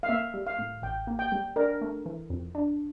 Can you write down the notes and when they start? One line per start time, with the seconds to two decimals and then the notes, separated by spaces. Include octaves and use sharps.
0.03 F5
0.09 A#3 E5
0.34 G3
0.47 F5
0.59 A2
0.82 A1 G5
1.07 A#3
1.19 G5
1.32 G3
1.56 D4 A#4
1.81 A3
2.06 E3
2.30 F2
2.55 D4